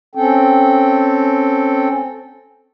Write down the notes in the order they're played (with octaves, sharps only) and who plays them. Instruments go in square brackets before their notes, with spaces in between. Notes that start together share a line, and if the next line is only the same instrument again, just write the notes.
[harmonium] C4 C#4 A4 G5